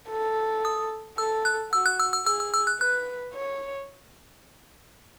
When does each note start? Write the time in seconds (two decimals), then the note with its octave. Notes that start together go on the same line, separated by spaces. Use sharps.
0.11 A4
0.65 D#6
1.18 A4 E6
1.45 F#6
1.72 F#4 E6
1.86 F#6
2.00 E6
2.13 E6
2.26 G#4 E6
2.40 E6
2.54 E6
2.67 F#6
2.80 B4 F#6
3.35 C#5